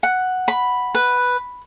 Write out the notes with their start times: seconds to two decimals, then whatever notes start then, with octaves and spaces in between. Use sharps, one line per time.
0.03 F#5
0.48 B5
0.95 B4